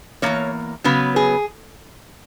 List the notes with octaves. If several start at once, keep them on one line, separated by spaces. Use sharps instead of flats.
E2 B2 A#3 C#5
C#3 F#3 B3 B4
G#4